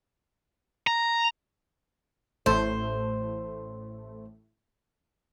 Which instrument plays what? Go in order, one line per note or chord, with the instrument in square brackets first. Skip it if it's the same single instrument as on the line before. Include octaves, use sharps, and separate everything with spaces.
[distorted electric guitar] A#5
[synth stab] A1 A2 A3 [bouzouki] C5